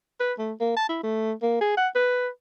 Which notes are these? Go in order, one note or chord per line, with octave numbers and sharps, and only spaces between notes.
B4
A3
A#3
A5
E4
A3
A#3
G#4
F#5
B4